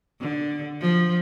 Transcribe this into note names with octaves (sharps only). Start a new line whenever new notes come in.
D3
F3